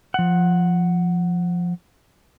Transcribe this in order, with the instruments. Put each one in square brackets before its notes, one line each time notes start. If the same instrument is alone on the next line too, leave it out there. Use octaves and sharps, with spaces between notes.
[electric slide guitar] F3 F#5